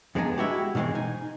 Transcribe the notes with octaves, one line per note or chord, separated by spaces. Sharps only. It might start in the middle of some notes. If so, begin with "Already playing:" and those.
F2 G#3 B3 D4 G#4 A#5
G#3 E4 F#4 G4
B2 D#3 E3 G#3 C4
D#4 G#5